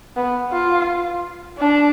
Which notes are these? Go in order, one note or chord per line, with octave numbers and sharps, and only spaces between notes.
B3
F4
D4